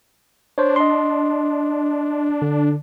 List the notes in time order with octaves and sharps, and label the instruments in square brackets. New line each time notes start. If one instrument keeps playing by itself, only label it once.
[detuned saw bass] D4 [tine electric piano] C5 C#5
[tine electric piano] D#5 C6
D3